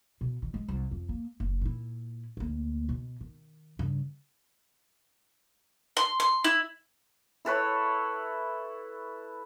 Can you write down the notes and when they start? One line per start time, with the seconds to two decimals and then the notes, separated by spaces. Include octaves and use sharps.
0.21 B2
0.42 D#3
0.54 G#3
0.68 C2
0.91 F2
1.09 A#3
1.40 F#1
1.61 A#2 E4
2.37 D2 A#3
2.89 B2
3.21 D#3
3.79 G2 C#3
5.97 C6
6.20 C6
6.44 E4
7.45 E4 A4 B4 C#5